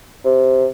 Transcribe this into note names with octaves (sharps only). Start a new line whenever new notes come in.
C3